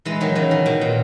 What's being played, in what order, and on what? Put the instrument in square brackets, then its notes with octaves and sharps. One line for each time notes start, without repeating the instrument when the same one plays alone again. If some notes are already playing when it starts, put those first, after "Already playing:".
[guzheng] E3 G#3
D#3 F#3
C#3 E3
D#3
B2
A#2